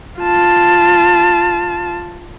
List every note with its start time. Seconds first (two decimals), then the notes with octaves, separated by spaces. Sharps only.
0.20 F4 A5